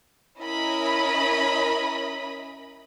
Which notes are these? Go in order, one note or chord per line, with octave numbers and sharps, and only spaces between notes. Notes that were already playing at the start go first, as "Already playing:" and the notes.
C#4 E4 A#4 D#5 B5